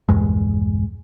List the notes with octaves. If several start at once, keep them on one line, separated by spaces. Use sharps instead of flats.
A#1 E2 G2 G#3